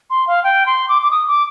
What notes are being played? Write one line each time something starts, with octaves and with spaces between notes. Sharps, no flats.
C6
F5
G5
C6
D6
D6
D#6
D6